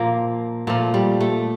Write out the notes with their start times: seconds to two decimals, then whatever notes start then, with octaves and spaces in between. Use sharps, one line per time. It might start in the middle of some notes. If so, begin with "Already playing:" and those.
Already playing: A#2 F3 A#3
0.67 A#2 F3 A3
0.94 G3
1.21 A3